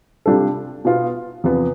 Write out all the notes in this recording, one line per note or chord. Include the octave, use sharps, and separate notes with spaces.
C3 G3 D4 F4 A4
B2 B3 F4
E2 C3 F3 B3